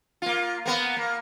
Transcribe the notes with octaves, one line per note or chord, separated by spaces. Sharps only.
A#3 F4
A#3 B3
A#3